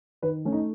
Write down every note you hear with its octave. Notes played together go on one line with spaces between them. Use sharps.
D#3 B4
A3 C#4
D#4